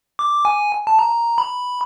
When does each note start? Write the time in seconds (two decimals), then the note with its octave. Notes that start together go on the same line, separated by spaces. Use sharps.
0.19 D6
0.45 G#5
0.87 A5
0.99 A#5
1.38 B5